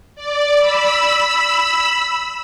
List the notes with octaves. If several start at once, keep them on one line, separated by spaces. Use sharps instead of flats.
D5
B5 E6